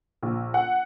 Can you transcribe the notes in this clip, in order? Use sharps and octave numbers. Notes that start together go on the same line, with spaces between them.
A#1
F#5